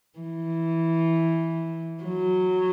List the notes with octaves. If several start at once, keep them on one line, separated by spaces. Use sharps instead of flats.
E3
F#3